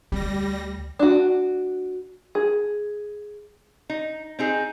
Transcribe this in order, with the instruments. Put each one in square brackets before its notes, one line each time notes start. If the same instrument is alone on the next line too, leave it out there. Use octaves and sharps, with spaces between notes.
[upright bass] D2 [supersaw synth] G3 A#6
[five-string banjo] D4 F#4
G#4
[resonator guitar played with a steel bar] D#4
C4 D#4 G#4